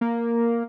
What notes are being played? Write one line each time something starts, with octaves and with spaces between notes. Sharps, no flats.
A#3